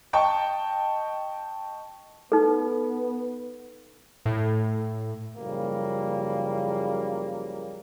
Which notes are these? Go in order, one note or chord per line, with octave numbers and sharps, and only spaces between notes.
D#5 G5 A5 C#6
B3 D#4 A4
A2
F#1 C#3 F3 G3 A#3